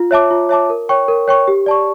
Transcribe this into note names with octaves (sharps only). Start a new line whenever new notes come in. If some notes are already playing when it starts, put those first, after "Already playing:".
Already playing: F4
C#5 E5 A5 D6
F4
C#5 E5 A5 D6
A#4
C#5 G5 C#6
A#4
C#5 G5 C#6
G4
D5 A5 C#6